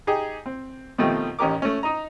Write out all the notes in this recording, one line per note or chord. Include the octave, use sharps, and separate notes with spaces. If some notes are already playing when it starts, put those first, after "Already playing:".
D#4 G4 G#4
C4
B2 D#3 F3 A3 C4 G4
A1 C#4 D#4 G4 A#4 D6
A3 C#4
D#4 D#5 A#5